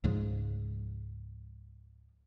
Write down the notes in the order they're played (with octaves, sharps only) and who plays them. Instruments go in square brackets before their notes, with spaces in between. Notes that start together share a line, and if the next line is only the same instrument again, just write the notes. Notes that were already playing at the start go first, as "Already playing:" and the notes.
[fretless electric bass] C#2 G#2 F3 G#3